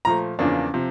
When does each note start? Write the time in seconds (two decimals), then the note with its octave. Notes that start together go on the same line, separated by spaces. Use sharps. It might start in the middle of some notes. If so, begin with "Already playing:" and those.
0.05 A#2 F3 A3 A#5
0.39 E2 C#3 F3 A#3 D4
0.74 C3 F3